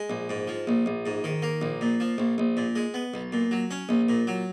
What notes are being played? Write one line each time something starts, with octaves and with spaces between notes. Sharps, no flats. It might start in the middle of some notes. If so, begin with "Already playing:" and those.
Already playing: G#3
A#1
G#2
F3
A#1
A#1
G#2
D#3
A#3
A#1
A#2
F3
A#1
A#1
A#2
G#3
B3
B1
A#2
F#3
C#4
A#1
A#2
F#3